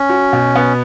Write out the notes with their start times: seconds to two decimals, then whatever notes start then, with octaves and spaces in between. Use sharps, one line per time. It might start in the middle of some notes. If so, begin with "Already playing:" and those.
Already playing: C#4
0.09 F#4
0.33 B2
0.55 B3